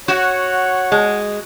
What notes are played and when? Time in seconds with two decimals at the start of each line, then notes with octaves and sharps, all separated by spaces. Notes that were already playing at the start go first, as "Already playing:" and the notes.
0.08 F#4 C#5 F#5
0.92 G#3